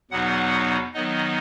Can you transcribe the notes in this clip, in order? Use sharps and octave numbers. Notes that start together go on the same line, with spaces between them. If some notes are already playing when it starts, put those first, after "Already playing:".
E2 B2 F#3 B3 D#4 F#5
D#3 F#3 B3 D#4 D#5